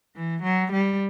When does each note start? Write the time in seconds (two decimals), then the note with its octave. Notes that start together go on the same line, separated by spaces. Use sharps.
0.16 E3
0.43 F#3
0.72 G3